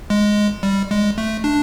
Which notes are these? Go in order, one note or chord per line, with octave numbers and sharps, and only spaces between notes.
G#3
G3
G#3
A3
D4